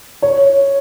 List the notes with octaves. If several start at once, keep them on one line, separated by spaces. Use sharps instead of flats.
C#5